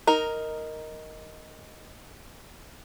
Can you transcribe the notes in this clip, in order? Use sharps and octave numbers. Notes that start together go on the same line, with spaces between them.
D#4 A#4